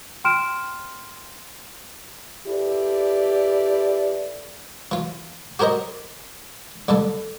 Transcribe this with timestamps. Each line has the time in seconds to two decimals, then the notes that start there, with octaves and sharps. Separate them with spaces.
0.24 G5 C6 F6 D7 E7
2.47 E4 G4 A4 B4 D5
4.91 E3 F4
5.59 F#4 G4 A#4 C5 D#5
6.88 A1 G2 D3 A4